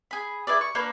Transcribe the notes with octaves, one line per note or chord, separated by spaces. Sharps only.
G#4 B5
E4 G#4 B4 D5
C#6
A#3 D4 A#4 B4